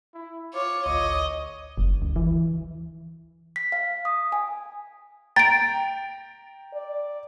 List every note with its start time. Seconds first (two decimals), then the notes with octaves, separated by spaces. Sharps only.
0.14 E4
0.54 F4 C#5 D6
0.86 A1 D2 C#5 D#5
1.78 F#1
2.02 D2
2.16 E3
3.56 B6
3.72 F5
4.05 D#6
4.32 G#5
5.36 G5 A#5 A6 D7
6.75 D5